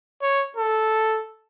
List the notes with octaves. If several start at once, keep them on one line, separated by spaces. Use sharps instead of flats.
C#5
A4